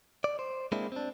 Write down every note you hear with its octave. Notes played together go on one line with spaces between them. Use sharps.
D5
C5
G#3 A#3 C4 D4 E4
C4 D4